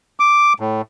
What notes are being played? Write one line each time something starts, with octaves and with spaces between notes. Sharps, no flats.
D6
A2